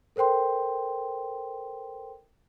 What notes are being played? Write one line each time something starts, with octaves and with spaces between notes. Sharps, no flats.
A4 A#4 C5 G5 C6